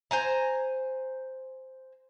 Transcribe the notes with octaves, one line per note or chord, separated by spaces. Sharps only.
C5 G#5 A#5